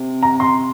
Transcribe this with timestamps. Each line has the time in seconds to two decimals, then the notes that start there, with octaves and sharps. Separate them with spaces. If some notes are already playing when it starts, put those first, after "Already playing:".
Already playing: C3
0.23 A#5
0.40 C6